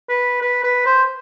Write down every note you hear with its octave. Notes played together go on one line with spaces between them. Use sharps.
B4
B4
B4
C5